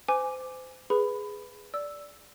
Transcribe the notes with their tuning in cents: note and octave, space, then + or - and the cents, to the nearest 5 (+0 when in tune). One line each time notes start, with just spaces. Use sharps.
C5 -35 G#5 +0 D6 +0
G#4 +0 B4 +0 B5 +15
D5 -10 E6 +0